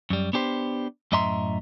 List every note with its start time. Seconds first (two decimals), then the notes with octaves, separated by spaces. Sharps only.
0.10 F#2 G3
0.33 B3 D4 G4 C5
1.12 F#2 A2 D#5 E5 A#5 C6